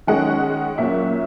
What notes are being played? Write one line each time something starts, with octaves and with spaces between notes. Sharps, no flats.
D#3 G#3 C#4 F#5
A#2 F#3 A#3 C#4 E5